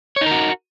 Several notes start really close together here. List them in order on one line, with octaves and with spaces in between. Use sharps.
C#5 D#4 A#4 F#4